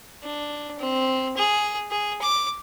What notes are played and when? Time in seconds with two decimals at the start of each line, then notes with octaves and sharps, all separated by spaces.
0.23 D4
0.79 C4
1.37 G#4
1.91 G#4
2.21 D6